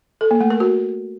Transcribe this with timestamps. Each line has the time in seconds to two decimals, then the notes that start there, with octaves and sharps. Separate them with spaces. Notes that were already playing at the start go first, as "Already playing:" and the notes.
0.21 A4
0.31 A#3
0.41 A3
0.50 A#4
0.60 F#4